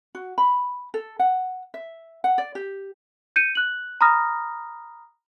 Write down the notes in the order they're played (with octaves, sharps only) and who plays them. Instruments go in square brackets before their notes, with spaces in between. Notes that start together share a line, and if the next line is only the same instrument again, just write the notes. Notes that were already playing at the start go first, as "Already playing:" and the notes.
[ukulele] F#4
B5
A4
F#5
E5
F#5
D5
G4
[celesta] G6 C#7 D#7
F#6 F#7
A#5 B5 D#6 F6 A#6